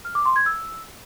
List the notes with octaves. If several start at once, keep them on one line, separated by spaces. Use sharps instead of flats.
F6
D6
C6
G#6
E6